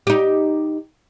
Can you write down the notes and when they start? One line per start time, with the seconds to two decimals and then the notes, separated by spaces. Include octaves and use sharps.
0.07 D#4 G4